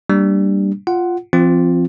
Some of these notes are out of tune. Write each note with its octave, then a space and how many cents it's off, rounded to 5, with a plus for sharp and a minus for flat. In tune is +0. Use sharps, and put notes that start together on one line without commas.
G3 +0 A#3 -15 D4 +0
F4 +0 F#5 +10
F3 -40 C4 +0 F4 +0